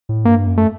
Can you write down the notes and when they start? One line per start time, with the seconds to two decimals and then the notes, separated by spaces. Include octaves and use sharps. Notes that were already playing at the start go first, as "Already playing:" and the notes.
0.09 A2
0.25 G2 A#3
0.47 F#2
0.57 A3